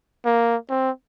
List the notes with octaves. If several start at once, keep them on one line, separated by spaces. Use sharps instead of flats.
A#3
C4